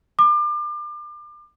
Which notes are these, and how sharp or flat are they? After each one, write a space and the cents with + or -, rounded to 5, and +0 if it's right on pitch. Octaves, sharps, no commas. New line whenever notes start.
D6 +35